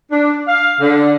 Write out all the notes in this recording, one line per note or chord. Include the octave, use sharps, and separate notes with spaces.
D4
F5
D3